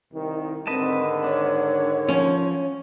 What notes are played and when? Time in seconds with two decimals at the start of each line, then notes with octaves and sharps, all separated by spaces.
0.13 C2 D#3
0.67 G#2 D3 D#3 C4 B4 D#5 A5
1.24 D4 C#5
2.09 F3 C#4